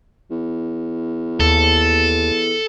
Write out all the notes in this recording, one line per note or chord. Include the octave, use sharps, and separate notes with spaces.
E2
D#2 A4